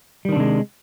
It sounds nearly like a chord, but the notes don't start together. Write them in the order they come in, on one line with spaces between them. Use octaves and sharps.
G3 D#3 D4 C3 G#3